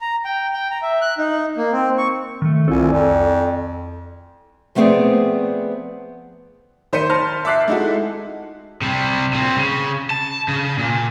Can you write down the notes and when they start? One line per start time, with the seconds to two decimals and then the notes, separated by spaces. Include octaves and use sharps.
0.01 A#5
0.25 G5
0.53 G5
0.71 A#5
0.82 E5
1.01 F#6
1.18 D#4
1.57 A#3
1.72 C4
1.98 C#6
2.42 D#3 A3
2.68 C2 C4 E4 F4 A4 G#5
2.92 F2 D5
4.75 F3 A3 B3 C4 G#4 D5
6.93 D#3 C5 G6 B6 C#7 D#7
7.10 A5 C6 F6 A#6
7.45 E5 A5 D6 F#6 B6 C7
7.68 G#3 D#4 E4 F#4 A4
8.82 C3 G3
9.33 A#2 C4
9.57 C#3
10.10 A5
10.48 C#3
10.78 A#2